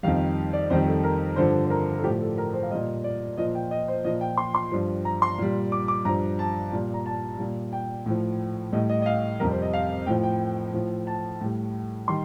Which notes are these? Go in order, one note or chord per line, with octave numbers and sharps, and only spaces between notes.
F2 D#3 G3 F5
D5
F2 D#3 G3 C5
A4
A#4
G2 D3 F3 C5
C5
A#4
A4
A2 F3 G4
A4
A#4
C5
F5
A#2 G3 D#5
D5
A#2 F3 D#5
G5
D#5
C5
A#2 F3 D#5
G5
C6
C6
G2 F3
A#5
C6
A#2 G3
D6
D6
G2 F3 A#5
A5
A#2 G3
A#5
A5
A#2 G3
G5
A2 F3
A2 G3 D#5
D#5
D#5
F5
F2 C3 G3 A#4
C5
D#5
F5
A2 F3 G5
G5
A2 F3
A5
A2 G3
D#3 G3 C6